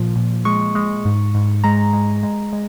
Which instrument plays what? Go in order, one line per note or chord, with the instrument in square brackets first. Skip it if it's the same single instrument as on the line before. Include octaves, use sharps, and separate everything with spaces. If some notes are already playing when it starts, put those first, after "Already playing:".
Already playing: [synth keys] A#2 F3
A#2
G#3 C#6
G#3
G#2
G#2
G#3 A#5
G#3
G#3
G#3